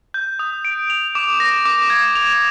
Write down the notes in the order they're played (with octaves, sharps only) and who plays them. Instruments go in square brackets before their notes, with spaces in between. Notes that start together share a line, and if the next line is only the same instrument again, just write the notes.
[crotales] G6
D#6
D7
F7
D6
A#6
D6
G#6
F7